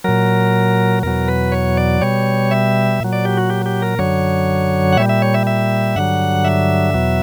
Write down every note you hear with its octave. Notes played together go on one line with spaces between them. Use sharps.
A#2 F#3 A#4
E2 B2 F#3 A#4
B4
C#5
D5
B2 G3 C#5
E5
A#2 F#3
D5
G4
F#4
G4
G4
A#4
F#2 D3 F#3 C#5
F#5
A#2 G3 E5
E5
C#5
E5
E5
G2 D3 F#3 F#5
E5
E2 B2 F#3